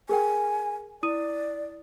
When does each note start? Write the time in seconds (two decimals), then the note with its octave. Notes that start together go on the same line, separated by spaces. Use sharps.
0.09 G#4 A#4 G5 G#5
1.03 E4 D5 D#6 D#7